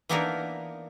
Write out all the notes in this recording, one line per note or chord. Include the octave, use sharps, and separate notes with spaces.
E3 A#3 B3 D4 D#4 A#4